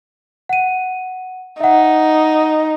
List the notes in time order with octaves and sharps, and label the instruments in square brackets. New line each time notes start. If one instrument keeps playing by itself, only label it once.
[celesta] F#5 D#7
[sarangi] D#4 [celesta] E5 F#5